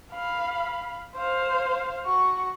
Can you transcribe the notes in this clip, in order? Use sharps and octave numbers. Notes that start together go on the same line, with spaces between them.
F5 B5
C5 F5
F#4 C#6